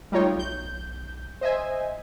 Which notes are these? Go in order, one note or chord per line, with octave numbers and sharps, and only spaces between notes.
G3 A3 D#4 F4 C#5 G5
B1 G6
C5 D#5 E5 G#5